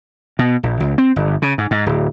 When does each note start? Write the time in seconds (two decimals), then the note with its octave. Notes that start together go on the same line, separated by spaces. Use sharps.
0.39 B2
0.63 A#1
0.80 C#2
0.98 C4
1.16 G1
1.42 C#3
1.58 G#2
1.71 G#2
1.86 D1